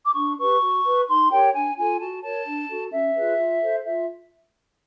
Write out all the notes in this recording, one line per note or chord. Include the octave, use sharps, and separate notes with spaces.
D6
D4 C#6
G4 B4 C#6
F#4
B4
D#4 C6
G4 A#4 C#5 G5
D4 G#5
F4 A4 G#5
F#4 A5
A#4 C#5 A5
D4
F#4 A4
C#4 E5
F4 G#4 B4
F4
A4 C5
F4 E5